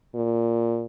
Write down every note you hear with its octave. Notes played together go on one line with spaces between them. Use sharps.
A#2